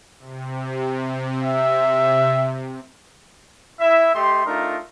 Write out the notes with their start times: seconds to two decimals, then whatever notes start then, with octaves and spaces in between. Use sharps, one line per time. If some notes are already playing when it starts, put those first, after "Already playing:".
0.19 C3
1.42 E5
3.79 E4 E5
4.14 A3 G4 D#5 C6
4.45 A3 D4 D#4 F4 A#4